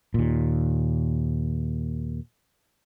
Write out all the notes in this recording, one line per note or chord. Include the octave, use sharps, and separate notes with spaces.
D#2 A#2